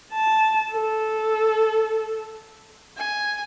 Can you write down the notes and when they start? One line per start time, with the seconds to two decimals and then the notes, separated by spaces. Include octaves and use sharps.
0.13 A5
0.73 A4
2.97 G#5